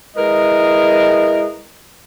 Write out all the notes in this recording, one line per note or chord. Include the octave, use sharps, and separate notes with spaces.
G#3 E4 A#4 B4 D#5